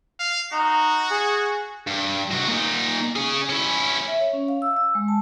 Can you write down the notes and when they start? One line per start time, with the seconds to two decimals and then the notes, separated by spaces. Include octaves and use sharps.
0.19 F5
0.53 D#4 F#4
1.11 G#4
1.87 G2
2.31 C3 F#4
2.48 A#2 D#4
3.16 C#4 G#4
3.49 C#4 E4
4.08 E5
4.21 C#5
4.33 C#4
4.48 F5
4.62 E6
4.77 E6
4.95 G#3
5.08 A5